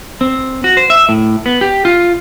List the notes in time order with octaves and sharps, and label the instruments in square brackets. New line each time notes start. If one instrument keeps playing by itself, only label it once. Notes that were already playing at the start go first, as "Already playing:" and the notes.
[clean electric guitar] C4
F#4
C5
E5
A2
B3
G4
F4